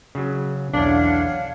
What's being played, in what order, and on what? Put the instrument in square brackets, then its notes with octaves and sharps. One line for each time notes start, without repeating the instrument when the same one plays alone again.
[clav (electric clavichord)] C#3 F#3
[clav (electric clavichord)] B1 E2 [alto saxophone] D4 [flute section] C#5 F5 F#5